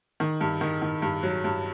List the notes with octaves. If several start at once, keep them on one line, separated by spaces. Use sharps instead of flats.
D#3
G2
D#3
D#3
G2
F#3
G2